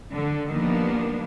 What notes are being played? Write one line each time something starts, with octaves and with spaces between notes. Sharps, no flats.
D3
D#3 F3 G3 A#3 B3 D4